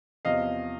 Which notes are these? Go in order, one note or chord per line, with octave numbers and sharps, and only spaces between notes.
E2 C3 F3 D#5 F5